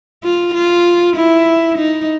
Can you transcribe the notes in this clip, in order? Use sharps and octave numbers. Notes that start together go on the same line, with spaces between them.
F4
F4
E4
D#4